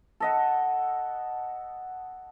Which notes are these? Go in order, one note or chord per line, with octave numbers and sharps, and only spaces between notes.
A4 D#5 F#5